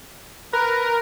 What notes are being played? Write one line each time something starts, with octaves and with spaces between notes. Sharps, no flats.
A#4 B4